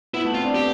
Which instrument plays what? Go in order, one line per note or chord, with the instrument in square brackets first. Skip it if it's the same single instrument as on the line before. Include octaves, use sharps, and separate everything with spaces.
[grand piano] B3 [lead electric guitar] E4
[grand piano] A3
[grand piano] C4 [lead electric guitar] F4
[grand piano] D4
[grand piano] B3 [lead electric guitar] G4